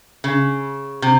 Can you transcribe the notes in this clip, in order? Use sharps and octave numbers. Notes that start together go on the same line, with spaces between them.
C#3
C3